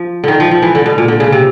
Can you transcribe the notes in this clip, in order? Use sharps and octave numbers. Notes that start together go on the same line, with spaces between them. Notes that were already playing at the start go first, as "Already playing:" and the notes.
Already playing: F3
D3 D#3
F3
F3
E3
D3
B2
A#2
D3
C#3
C3